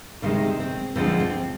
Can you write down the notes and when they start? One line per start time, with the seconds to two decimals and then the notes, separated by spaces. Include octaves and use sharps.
0.22 D2 C3 D#3 G#3 A#3
0.60 C4
0.96 D2 D3 F3 G#3 C4
1.20 C4